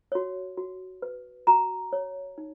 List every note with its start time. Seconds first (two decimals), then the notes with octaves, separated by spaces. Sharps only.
0.12 F#4 C#5
0.57 F#4
1.02 B4
1.47 F#4 A#5
1.93 C#5
2.38 D#4